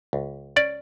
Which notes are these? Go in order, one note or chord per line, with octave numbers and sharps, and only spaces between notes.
C#2
C#4 D5